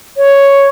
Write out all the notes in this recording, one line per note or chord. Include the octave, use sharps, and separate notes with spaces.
C#5